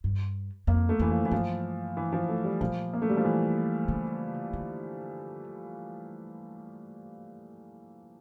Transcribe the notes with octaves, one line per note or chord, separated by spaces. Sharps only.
G2
F2 A#3
A3
F2 E3
F3
E3
G2 F3
E3
F3
A3
G3
A#2 F3
A#3
A3
G3
F3
E3
C#3
D3